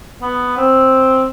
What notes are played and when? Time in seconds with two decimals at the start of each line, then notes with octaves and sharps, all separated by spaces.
0.22 B3
0.57 C4